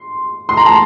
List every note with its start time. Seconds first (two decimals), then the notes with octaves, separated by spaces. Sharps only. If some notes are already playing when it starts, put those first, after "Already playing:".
Already playing: C6
0.49 C6
0.57 A#5
0.65 A5 C6